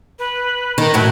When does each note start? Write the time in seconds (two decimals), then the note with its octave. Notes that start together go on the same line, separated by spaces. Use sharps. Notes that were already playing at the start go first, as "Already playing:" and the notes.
0.19 B4
0.78 D#3 A#5
0.94 F#2 A2 F#3 B4